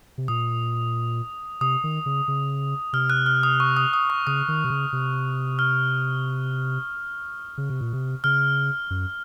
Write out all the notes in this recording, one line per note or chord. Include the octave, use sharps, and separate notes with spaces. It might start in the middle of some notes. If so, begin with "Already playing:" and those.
C3
A#2 D#6
C3 D#6
D#3
C#3
C#3
C3 F6
F#6
F6
D#6
C#6
D#6
D#6
C#6
C#3 D#6
D#3
C3
C#3
C3
F6
C#3
C3
A#2
C3
C#3 F6
F#2